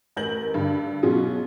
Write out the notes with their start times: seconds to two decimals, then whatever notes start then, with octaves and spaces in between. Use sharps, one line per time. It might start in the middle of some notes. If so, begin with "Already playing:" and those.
0.17 A1 A#4 B4 G6 A#6 F#7
0.54 G2 D3 G3
1.03 B2 F#3 C#4 F4 F#4 G#4